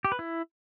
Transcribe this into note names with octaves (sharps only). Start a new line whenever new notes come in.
G4
B4
E4